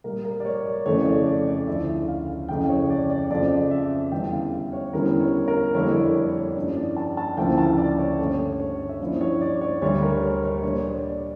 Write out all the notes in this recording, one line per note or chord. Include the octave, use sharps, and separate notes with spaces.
A#2 G3 A#3 A#4
A#4
D5
C#5
D5
F2 C#3 E3 A3 C#5
D5
D5
D5
D2 C#3 F3 C#4 E4 E5
F5
F2 C#3 E3 G5
C#5
D5
D5
F2 C#3 F3 D5
E5
E2 D3 G3 C#4 E4 G5
F5
E5
C#5
E2 D3 G3 C#4 E4 A#4
C#5
A#4
F2 D3 G3 A#3 E4 C#5
D5
C#5
A#4
C#5
G2 F3 C#4 E4 D5
D5
A5
A5
D2 C#3 F3 A#3 E4 G5
A5
D5
C#5
G2 D3 A3 C#4 C#5
C#5
E5
G2 F3 A#3 C#4 E4 D5
C#5
D5
C#5
D2 D3 G3 D4 C#5
A#4
C#5
C#5
A#2 G3 D4 C#5
C#5
D5